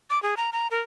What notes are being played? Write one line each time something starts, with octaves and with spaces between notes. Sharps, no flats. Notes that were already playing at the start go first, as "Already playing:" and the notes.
D6
G#4
A#5
A#5
A#4